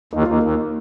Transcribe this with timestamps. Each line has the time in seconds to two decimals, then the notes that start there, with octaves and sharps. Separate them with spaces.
0.13 D#2 D#4
0.22 F4
0.27 D#2 A#3 D#4
0.43 D#2